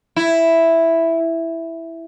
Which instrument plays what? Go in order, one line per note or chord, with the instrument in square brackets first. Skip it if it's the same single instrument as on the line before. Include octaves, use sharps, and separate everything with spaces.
[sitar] E4